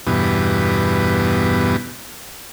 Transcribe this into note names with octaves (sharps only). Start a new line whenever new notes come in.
E2 G2 B2